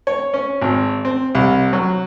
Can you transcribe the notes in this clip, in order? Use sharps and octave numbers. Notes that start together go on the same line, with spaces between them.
C#5
C#4
G#1
C4
C2
F#3